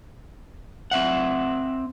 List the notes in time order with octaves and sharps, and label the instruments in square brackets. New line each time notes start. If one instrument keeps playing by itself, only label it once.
[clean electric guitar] C4 E5 F#5